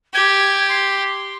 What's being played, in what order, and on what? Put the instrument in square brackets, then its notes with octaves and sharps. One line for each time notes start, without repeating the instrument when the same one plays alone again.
[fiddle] G4 [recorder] G#6
[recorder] C6